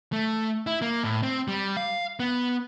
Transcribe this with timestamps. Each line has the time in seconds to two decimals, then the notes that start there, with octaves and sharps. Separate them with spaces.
0.12 A3
0.67 E4
0.82 A#3
1.04 A2
1.23 C4
1.48 G3
1.77 F5
2.20 B3